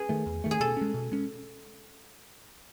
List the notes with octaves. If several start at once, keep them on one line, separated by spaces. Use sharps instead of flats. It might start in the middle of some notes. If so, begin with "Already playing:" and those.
Already playing: G#4 B4
D#3 A3
E2
D#3 A3
G#4
B2 A4
G#3 C#4
B2
G#3 C#4